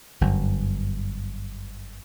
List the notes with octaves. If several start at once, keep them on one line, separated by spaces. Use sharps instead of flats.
G1 F#2